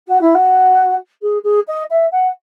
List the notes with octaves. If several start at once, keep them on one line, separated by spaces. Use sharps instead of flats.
F#4
E4
F#4
G#4
G#4
D#5
E5
F#5